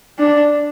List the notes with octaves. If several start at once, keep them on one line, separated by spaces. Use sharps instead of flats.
D4